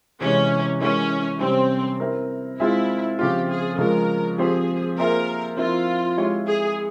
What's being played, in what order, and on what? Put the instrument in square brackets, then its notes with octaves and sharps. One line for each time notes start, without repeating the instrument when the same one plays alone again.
[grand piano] C3 E3 G#3 [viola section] C#4
[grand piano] E3 G#3 E4 A#4 [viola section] C#4
[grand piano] C3 G3 C#4 [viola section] C4
[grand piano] C4 E4 A#4
[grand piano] G#3 C4 F4 G#4 E5 [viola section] E4
[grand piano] C#3 F3 C4 F4 [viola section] G4
[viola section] G#4
[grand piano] C#3 F3 G#3 [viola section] A#4
[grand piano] F3 C4 G4 C5 [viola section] G#4
[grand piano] A#3 F4 G#4 C5 E5 [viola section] A#4
[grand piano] F3 C4 E4 A#4 [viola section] F4
[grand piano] G#3 E4 G4 C#5 E5
[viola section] G#4